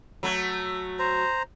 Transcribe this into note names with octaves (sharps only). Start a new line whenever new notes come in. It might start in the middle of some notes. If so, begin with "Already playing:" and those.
F#3 A3
C5 A#5